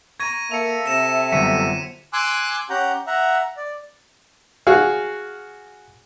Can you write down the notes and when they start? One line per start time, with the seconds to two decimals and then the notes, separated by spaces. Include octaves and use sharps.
0.20 A#5 C#6 G#6 A#6 D#7
0.51 A#3 A4 E5 C#7 F7
0.86 C3 A#6 E7
1.32 G1 F#2 D3 B6 C#7 D#7
2.13 G#5 C6 D6 E6 F#6
2.70 C#4 G4 F#5 A#5 G6
3.07 E5 F#5 A#5
3.57 D5
4.67 F#4 G#4 F5